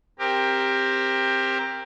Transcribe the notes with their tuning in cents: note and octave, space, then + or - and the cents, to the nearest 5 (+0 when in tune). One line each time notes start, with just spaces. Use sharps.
C4 +10 G4 +15 A#4 +0